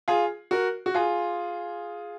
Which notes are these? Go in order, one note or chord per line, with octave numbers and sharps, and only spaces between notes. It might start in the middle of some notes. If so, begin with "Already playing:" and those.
F4 G#4
F#4 A#4
F#4
F4 G#4